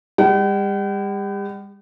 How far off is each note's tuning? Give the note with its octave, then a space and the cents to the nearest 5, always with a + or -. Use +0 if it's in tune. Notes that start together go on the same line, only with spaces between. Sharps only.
G3 +40 G5 -45